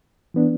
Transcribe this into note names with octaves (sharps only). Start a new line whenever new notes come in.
E3 B3 D4